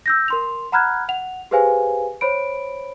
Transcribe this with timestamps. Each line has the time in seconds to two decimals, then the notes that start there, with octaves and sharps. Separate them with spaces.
0.06 E6 G6 A#6
0.28 A#4 C6 F7
0.72 F#5 A#5 B5 F6 F#6 G#6
1.09 F#5 F7
1.51 G4 G#4 B4 C5 F5 G#5
2.21 C5 C#5 B5 D7